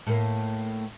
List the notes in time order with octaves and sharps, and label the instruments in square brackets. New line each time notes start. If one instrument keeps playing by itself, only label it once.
[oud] A2 A#3